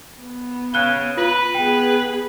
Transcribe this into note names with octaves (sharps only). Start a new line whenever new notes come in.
B3
C#3 F#6 G7
F4 B4
B3 G#4 G5